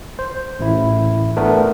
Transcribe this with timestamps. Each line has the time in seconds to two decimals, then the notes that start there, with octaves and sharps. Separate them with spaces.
0.19 C5
0.60 A1 E4
1.37 A3 B3 D4 A#4